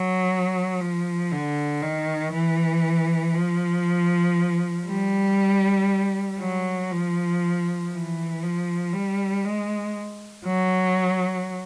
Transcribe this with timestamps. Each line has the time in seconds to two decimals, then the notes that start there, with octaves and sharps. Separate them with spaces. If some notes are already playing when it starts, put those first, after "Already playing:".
Already playing: F#3
0.80 F3
1.31 D3
1.82 D#3
2.32 E3
3.34 F3
4.87 G3
6.40 F#3
6.91 F3
7.92 E3
8.43 F3
8.93 G3
9.44 G#3
10.46 F#3